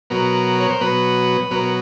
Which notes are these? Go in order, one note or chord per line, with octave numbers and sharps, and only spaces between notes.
B2 F#3 B3 A#4
C#5
C5
B2 F#3 B3 B4
B2 F#3 B3 A#4